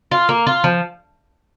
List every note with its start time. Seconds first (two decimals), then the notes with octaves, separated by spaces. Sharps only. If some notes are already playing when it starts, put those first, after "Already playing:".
0.11 F4
0.29 A#3
0.47 F4
0.64 F3